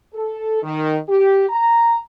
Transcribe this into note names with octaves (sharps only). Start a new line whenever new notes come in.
A4
D#3
G4
A#5